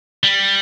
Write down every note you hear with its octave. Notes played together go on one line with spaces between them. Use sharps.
G3